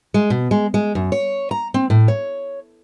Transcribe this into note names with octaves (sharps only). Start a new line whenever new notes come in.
G#3
B2
G#3
G#3
F#2
C#5
A#5
C4
A2
C#5